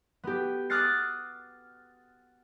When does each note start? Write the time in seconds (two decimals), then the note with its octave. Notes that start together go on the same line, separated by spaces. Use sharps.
0.23 B3 G4
0.70 D6 D#6 F6 F#6 A6 C7